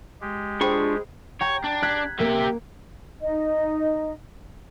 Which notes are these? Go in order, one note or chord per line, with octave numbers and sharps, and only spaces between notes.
G#3 G4
D4 F4 G#4 C5 G5 B5 C#6
C#5 G5 A#5
D4
F#6 G#6 B6
A#3 G4 E5
D#4 D#5